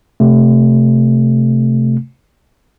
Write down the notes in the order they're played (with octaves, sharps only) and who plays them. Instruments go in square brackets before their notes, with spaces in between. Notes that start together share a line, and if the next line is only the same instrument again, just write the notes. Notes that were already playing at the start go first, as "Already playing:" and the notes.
[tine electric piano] C3 A3